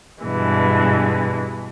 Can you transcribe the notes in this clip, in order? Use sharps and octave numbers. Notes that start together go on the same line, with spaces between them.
G2 B2 E3 G#3